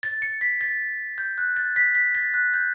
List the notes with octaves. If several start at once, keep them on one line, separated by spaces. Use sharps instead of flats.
A6
C#7
B6
A6
G6
F#6
A6
B6
B6
A6
F#6
G6